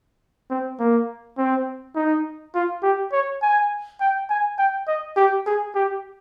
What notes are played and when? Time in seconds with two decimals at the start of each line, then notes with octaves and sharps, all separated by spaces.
0.50 C4
0.80 A#3
1.38 C4
1.95 D#4
2.55 F4
2.83 G4
3.12 C#5
3.42 G#5
4.01 G5
4.30 G#5
4.58 G5
4.87 D#5
5.17 G4
5.46 G#4
5.75 G4